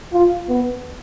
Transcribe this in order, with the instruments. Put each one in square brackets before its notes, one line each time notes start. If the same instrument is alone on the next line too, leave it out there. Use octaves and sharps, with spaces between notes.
[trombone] F4
B3